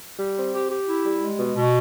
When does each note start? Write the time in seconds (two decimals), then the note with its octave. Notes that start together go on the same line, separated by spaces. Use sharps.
0.17 G3
0.35 C4
0.51 G4
0.69 G4
0.86 E4
1.04 G3
1.21 G#3
1.38 B2
1.56 B2